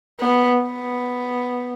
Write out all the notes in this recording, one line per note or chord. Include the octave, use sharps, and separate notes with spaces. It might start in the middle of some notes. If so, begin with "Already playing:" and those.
B3
B3